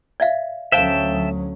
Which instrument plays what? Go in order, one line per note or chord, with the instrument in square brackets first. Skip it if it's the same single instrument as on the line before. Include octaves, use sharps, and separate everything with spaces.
[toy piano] D5 E5 F5
[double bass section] D2 F#3 C#4 [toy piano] C5 F5 [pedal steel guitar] E5 G5 A5